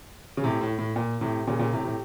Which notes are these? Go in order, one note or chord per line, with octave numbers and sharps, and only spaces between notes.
C#3
A2 C3
A2
A2
A#2
A2 C3
A#2 C#3
A#2 C#3
A2 C3
A2 C3